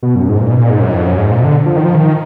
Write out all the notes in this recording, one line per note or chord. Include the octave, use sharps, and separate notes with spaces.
B2
F#2
G#2
A#2
B2
A#2
G#2
F#2
F2
F#2
G#2
A#2
B2
D3
F3
D#3
F3
D#3